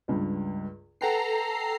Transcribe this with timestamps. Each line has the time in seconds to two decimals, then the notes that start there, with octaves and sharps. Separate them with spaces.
0.08 C#2 G2
1.01 A4 B4 F#5 G5 A#5 C7